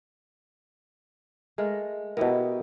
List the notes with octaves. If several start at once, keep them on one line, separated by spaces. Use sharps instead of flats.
G#3 A3 A#4
B2 B3 E4 G4 A#4